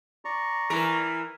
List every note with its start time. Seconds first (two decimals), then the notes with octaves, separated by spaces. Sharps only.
0.25 D5 A#5 C#6
0.70 E3 A#4